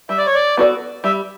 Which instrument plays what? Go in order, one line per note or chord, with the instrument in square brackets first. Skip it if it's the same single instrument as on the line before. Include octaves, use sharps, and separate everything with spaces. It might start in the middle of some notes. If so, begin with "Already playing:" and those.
[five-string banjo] G3 [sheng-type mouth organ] E5
[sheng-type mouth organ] D5
C#5
D5
[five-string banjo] B3 F#4 A4 D5
[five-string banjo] G3 [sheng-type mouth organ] E5